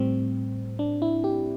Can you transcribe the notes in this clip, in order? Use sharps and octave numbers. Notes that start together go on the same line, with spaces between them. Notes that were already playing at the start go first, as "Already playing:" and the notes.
Already playing: A2 G3 C4
D4
E4
G4